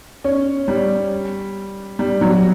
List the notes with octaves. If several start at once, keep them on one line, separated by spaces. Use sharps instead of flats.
C#4
G3
G3
F#3